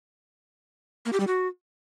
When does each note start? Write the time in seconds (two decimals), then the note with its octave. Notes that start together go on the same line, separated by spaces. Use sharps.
1.06 A#3
1.13 G4
1.20 G3
1.27 F#4